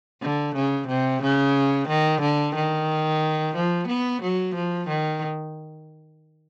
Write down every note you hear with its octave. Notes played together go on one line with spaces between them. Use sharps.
D3
C#3
C3
C#3
D#3
D3
D#3
F3
B3
F#3
F3
D#3